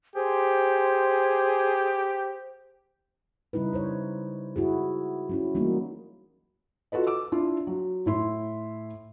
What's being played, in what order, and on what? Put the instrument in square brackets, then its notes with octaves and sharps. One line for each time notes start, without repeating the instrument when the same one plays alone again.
[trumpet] G4 [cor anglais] G#4 [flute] C5
[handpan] C#3 G3 D#4 E4 B4
E4 C5 C#5
E4 F#4 G#4
F#3 C#4 E4
E3 F#3 G3 A3 A#3 D#4
[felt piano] F4 F#4 A4 B4 D#5
D6 E6
D4 E4 F4
F#3
A2 E4 C6